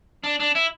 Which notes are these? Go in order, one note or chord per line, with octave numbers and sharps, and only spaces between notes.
D4
D4
E4